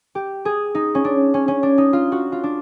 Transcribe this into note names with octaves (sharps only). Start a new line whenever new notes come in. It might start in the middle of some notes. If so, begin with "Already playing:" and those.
G4
G#4
D#4
C#4
D4
C#4
C#4
D4
D#4
F4
F#4
F4
D4